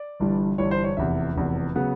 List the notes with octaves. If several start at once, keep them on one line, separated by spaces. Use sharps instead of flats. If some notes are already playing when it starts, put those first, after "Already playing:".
Already playing: D5
G1 G2 E3 G3
G1 G2 E3 G3 C#5
C5
C#5
F1 E2 C3 E5
F1 E2 C3
C#3 F#3 B3 F#5